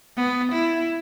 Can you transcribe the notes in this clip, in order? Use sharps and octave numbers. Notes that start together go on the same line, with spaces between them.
B3
E4